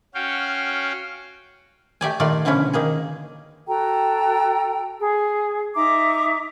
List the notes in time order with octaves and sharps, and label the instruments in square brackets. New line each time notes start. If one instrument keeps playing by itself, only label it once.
[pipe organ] C#4 F#4 F5 G5
[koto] A3 G4 D5 G#5
A#2 D#3 A3 F4 D5
B2 D3 E3 F3 C#4
D#3 A#3 G#4
[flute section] F#4 A4 G5 A#5
G#4
D#4 E5 A#5 D6